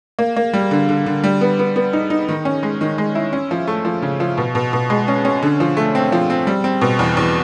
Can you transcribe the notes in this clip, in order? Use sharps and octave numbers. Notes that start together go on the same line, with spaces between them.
A#3
A#3
G3
D3
D3
D3
G3
B3
B3
B3
D#4
D#4
D#3
C#4
G#3
D#3
G#3
E4
C#4
F3
A3
F3
C#3
F3
B2
B2
B2
G#3
C#4
C#4
D3
F3
A3
C4
F3
C4
G3
C4
B2
E2
E2